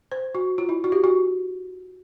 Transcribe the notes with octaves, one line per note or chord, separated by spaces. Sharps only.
C5
F#4
F4
E4
F#4
G4
F#4